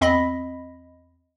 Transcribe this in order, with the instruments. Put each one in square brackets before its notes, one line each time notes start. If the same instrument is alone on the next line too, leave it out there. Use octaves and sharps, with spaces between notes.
[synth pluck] E2 C4 D#5 B5 A#6 B6